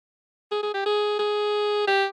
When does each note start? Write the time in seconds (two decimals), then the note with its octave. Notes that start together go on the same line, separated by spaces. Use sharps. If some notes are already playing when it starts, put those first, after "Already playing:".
0.52 G#4
0.63 G#4
0.74 G4
0.86 G#4
1.19 G#4
1.87 G4